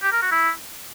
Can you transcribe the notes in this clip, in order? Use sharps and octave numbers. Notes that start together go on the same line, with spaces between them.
G4
A#4
F#4
E4